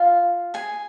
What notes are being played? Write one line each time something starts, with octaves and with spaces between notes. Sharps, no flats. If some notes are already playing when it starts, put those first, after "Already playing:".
Already playing: F4 F5
G#4 G#5